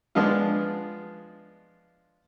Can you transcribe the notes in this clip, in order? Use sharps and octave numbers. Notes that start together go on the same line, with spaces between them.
F3 G#3 B3 D4 F4